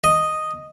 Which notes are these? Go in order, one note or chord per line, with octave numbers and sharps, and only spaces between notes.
D#5